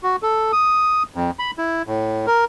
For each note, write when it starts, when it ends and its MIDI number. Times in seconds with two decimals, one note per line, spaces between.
0.03 0.16 66
0.23 0.52 69
0.53 1.03 87
1.15 1.31 41
1.39 1.51 83
1.58 1.82 64
1.87 2.26 45
2.27 2.45 70